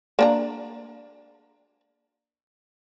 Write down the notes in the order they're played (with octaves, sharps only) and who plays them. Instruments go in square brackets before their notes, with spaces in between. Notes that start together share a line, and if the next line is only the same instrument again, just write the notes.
[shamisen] A#3 D4 A#5